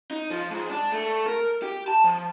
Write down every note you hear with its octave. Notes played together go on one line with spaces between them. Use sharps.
D#4
F3
G#2
D4
A3
A#4
G4
A5
F3